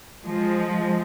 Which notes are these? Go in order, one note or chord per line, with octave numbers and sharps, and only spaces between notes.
F3 G#3